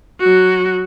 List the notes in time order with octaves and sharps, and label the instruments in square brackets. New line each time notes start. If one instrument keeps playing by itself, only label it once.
[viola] F#3 F#4